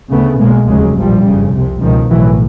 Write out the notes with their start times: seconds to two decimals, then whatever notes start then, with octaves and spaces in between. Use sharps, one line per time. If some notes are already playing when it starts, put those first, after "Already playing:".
0.11 D2 C#3 A3 B3
0.40 B1 B2 G#3 A#3
0.68 F1 D#2 C#3 F#3 G#3
0.96 A#1 A2 F3 G3
1.25 G1 F2 C#3
1.53 C2 C3
1.82 C#2 B2 D#3 F3
2.10 B1 A2 E3 F#3